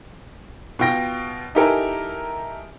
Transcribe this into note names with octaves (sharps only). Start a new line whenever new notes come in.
B2 F4 G5 A#6
D#4 E4 G4 A4 A#4 G#5